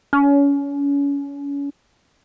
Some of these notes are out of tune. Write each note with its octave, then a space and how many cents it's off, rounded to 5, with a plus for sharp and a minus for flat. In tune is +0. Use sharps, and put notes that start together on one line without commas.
C#4 +30